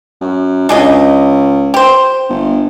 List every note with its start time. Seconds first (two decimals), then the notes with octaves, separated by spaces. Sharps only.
0.21 F#2
0.69 C#2 D4 G#4 D#5
1.74 G4 C5
2.29 G1